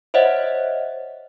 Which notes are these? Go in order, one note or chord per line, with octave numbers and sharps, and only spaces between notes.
C5 C#5 D#5 E5 F#5